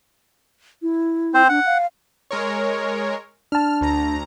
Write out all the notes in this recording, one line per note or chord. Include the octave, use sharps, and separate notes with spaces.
E4
C4 C5
D4 F#5
F5
G#3 A#4 C#5
D4 A5 F6
D2 A#5